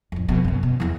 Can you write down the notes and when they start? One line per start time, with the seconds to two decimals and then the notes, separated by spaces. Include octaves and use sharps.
0.12 A1 F2
0.28 F2 B2
0.44 F#2 B2
0.63 B2
0.80 E2 E3